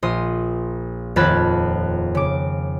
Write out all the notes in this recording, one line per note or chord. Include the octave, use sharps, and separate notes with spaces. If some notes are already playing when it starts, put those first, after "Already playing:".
A#1 C6 D#6
D#1 F2 A5 B5 F#6 G#6
C#3 D6